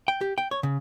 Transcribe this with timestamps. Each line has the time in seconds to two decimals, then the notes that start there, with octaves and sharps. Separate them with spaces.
0.08 G5
0.21 G4
0.38 G5
0.51 C#5
0.63 C#3